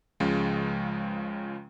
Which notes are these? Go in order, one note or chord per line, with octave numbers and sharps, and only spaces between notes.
C#2 C#3 F3 G#3